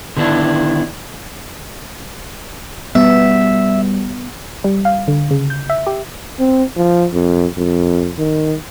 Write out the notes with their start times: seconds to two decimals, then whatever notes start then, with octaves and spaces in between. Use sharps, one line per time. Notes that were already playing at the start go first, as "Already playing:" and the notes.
0.17 D3 D#3 B3 D4 E4
2.95 G3 B3 E5
4.64 G3
4.85 F5
5.08 D3
5.31 C#3
5.50 G6
5.70 E5
5.87 G4
6.39 C4
6.77 F3
7.14 F2
7.57 F2
8.18 D#3